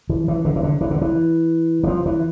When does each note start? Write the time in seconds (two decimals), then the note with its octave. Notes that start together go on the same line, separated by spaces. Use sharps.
0.09 E3
0.28 E3
0.45 D3
0.56 E3
0.63 D3
0.81 E3
0.91 D3
1.02 E3
1.83 E3
1.88 F3
2.06 E3